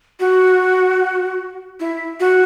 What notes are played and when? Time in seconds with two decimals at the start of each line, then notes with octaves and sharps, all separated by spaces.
0.20 F#4
1.80 E4
2.20 F#4